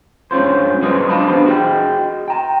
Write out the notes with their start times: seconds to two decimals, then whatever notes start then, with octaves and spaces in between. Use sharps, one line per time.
0.31 G2 G#3 C#4 F4 C5
0.82 F#3 G#3 F#4 B4 C5 D#5
1.10 D4 F5 A5 B5
1.26 B3 D4 G4 C5
1.46 F#4 G#4 D#5 G5
2.28 G5 A#5